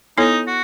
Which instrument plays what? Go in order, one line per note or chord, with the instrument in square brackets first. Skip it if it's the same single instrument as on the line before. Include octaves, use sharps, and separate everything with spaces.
[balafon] B3 E4 A4 C#5 [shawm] D#4
[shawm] F#4